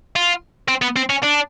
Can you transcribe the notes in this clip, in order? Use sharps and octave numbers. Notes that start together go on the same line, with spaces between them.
F4
C4
B3
C4
C#4
D4